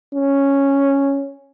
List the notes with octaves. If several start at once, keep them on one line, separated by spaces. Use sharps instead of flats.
C#4